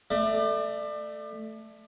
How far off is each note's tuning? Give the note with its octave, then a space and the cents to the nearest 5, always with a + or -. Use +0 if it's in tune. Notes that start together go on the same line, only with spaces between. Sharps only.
A3 +0 D5 +30